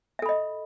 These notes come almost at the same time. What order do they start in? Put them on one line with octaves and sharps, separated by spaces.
E5 A4 B5 D#5